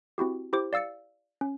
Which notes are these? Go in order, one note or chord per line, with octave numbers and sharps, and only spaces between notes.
C4 E4 F#4 G4
E4 G4 C5 D6
D5 F5 E6 A6 C#7
C#4